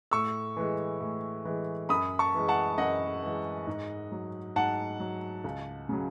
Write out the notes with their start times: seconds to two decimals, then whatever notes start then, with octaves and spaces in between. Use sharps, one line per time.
0.11 A2 C#6 E6
0.57 E3 G#3
1.01 A2
1.45 E3 G#3
1.89 F#2 B5 D#6
2.19 A5 C#6
2.35 E3 G#3
2.48 F#5 A5
2.78 F#2 D#5 F#5
3.23 E3 G#3
3.67 G#2
4.12 F#3
4.56 G#2 F#5 A5
5.00 F#3
5.44 C#2
5.89 C#3 F#3